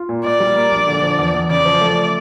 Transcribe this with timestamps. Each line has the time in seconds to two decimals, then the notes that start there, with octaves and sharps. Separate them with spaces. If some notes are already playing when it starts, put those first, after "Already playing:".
Already playing: F4
0.09 A#2
0.24 A#2 D5
0.40 G3
0.56 A#3
0.71 A#1
0.87 D3
1.03 F3
1.18 E2
1.34 E2
1.50 C#3 D5
1.65 F3
1.81 A3